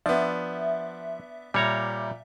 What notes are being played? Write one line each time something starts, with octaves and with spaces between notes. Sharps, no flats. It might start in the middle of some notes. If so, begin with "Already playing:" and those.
F3 B3 D4 E5
A#2 G3 C#5 A#5